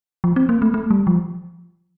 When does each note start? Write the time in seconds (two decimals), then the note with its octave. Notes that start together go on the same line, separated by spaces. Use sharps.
0.24 F3
0.36 C4
0.49 A#3
0.62 A3
0.74 A3
0.91 G3
1.07 F3